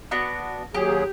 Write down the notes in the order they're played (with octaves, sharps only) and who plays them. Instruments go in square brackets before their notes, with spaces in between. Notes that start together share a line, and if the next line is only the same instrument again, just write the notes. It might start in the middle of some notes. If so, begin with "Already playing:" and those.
[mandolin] B3 D4 F#4
[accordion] D#2 F#3 G#4 [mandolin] G4